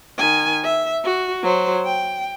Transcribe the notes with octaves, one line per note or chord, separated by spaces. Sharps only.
D#3 G#5
E5
F#4
F#3 C5
G5